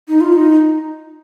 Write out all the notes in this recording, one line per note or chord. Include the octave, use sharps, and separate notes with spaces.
D#4
F4
D#4